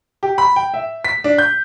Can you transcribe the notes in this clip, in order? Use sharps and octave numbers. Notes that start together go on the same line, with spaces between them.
G4
B5
G5
E5
B6
D4
G6